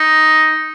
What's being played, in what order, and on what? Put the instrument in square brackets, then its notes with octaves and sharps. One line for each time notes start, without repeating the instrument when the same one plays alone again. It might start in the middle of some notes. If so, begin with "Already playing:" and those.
Already playing: [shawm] D#4